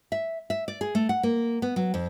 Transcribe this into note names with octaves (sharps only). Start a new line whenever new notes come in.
E5
E5
D5
G#4
A3
F#5
A#3
B3
F#3
F2